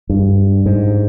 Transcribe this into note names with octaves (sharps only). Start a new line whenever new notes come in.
G2
G#2